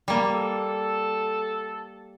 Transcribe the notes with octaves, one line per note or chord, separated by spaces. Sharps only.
G3 A#3
A4